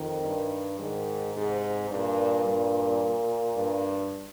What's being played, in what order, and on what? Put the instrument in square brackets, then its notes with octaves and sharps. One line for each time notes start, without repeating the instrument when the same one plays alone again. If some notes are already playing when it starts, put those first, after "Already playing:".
Already playing: [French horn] F2 [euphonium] D#3
[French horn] G2
[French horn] G#2 [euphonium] D#3
[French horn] G#2 [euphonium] C3
[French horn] G2 [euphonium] A#2
[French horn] G2
G2